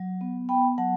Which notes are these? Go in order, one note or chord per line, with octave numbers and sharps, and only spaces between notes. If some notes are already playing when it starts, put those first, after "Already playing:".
Already playing: F#3
B3
B3 G5 B5
F#3 F#5 A5